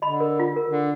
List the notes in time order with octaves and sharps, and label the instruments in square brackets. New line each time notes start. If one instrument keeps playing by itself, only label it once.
[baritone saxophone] D3 [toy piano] D#5 B5
[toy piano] A#4
F4
A#4
[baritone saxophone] D3